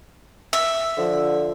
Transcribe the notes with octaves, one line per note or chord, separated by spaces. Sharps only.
E5
D3 F3